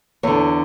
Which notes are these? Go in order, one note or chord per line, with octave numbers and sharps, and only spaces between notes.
E2 D3 C#5